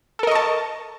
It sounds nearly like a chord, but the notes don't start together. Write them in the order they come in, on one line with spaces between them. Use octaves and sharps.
A4 A#4 D#5 C#6 A5